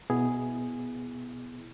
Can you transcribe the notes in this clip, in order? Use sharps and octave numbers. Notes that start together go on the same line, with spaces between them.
B2 B3 E4 G#4